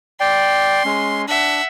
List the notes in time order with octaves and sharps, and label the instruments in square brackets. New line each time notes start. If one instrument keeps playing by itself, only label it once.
[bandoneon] D5 G5 [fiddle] C6
[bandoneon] G#3 C#4
[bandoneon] D4 [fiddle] E5 F#5